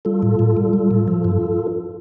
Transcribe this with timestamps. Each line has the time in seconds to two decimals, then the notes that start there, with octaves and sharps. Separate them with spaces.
0.05 G3 F4 A4
0.23 A2
0.39 A2
0.57 G3
0.73 G3
0.91 A2
1.08 F3
1.24 G2